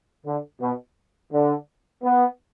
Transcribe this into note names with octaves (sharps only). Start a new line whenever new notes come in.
D3
B2
D3
B3